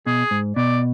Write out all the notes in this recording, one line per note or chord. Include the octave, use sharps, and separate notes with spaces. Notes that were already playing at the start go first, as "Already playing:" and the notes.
B2 G#4
G#2
B2 D5